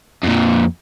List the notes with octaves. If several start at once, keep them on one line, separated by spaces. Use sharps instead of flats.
F2 A#2